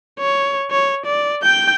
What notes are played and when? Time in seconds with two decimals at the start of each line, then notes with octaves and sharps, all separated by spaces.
0.19 C#5
0.71 C#5
1.06 D5
1.42 G5 G6